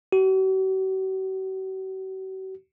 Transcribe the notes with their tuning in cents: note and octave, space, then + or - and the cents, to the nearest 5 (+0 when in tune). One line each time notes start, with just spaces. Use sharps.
F#4 +45